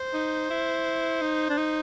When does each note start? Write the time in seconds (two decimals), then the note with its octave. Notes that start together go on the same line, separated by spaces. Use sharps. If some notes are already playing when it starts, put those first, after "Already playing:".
Already playing: C5
0.14 D#4
0.50 E4
1.22 D#4
1.50 D4
1.57 D#4